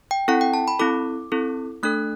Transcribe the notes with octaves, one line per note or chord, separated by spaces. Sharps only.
G5
C4 E4 A4 F#5
G5
A5
B5
C4 E4 A4 D6
C4 E4 A4
A3 D4 A4 F#6